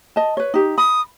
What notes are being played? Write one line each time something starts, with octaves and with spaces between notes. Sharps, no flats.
D#5 A5
B4 C#5
D#4 G4
B5 D#6